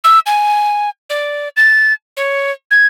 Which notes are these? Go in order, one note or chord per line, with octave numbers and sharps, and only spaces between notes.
E6
G#5
D5
A6
C#5
G#6